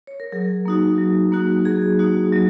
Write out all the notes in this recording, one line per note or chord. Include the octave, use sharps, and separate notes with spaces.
C#5
A#4
F#3 G#4
A#3 D#4 F#4
F#3
A#3 D#4 F#4
F#3 G#4
A#3 D#4 F#4
F#3